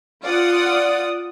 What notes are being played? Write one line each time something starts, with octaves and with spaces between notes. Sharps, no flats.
F4 D5 F#5 D#6